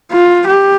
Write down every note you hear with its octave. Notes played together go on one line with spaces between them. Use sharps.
F4
G4